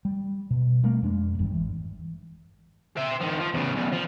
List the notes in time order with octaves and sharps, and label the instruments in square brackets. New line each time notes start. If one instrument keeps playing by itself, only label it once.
[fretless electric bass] G3
B2
G3 A3 A#3 C4
F2 G#3 D4
G1 E2 G2
G#1 E3
[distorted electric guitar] C5 E5
D#3 F3
F3
E2 C#3
B1 E2
F3